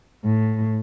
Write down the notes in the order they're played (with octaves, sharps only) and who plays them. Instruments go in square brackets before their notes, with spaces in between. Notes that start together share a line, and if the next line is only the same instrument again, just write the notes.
[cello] A2